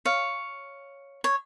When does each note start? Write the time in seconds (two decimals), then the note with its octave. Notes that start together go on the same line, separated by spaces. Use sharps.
0.05 C#5 F5
1.24 C#5